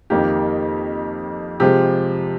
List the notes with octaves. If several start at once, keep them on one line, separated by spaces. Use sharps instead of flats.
F2 D#3 A#3 G4
C3 F3 G#3 G4